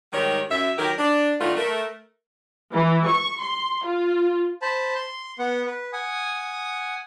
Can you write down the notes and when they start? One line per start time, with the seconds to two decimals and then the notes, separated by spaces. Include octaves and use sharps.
0.13 G#2 D#3 G3 G4 A#4 C#5
0.50 F#2 E5
0.78 D#3 F#3 G4 A#4
0.98 D4
1.40 D#3 A3 B3 D4 D#4 F4
1.57 A3 A#4
2.72 E3
3.06 C#6
3.40 C6
3.84 F4
4.62 C5 A5 B5
4.95 C6
5.39 B3 F#5
5.66 B4
5.93 F#5 G#5 D#6